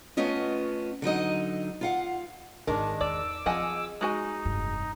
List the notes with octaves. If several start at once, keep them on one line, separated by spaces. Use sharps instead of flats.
A3 B3 C#4 F4 D#5
D3 F#3 D#4 D#5
F4 F5 F#5
G#1 D#3 G#3 D4 A#4
E2 D5 D6 E6
F3 C4 G#4 D#5 F#5 G#5
G#3 D#4 F#4 G#5
F1 G2